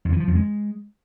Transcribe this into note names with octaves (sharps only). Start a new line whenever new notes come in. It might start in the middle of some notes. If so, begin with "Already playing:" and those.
F2
E3
F3
F2
G#3